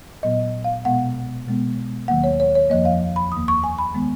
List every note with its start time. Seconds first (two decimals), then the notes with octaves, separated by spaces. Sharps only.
0.23 A#2 F#3 B3 D#5
0.64 F5
0.85 B2 G#3 B3 F#5
1.46 B2 G#3 B3
2.08 D#2 D#3 F#3 A#3 F#5
2.24 C#5
2.40 C#5
2.55 C#5
2.70 F2 F3 A#3 D#5
2.85 F5
3.16 B5
3.32 D#2 D#3 A#3 D#6
3.48 C#6
3.64 G#5
3.79 B5
3.94 D#3 G#3 B3